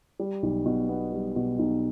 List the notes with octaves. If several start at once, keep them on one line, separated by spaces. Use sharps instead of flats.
G3
B1
B2
B3
G3
B2
B1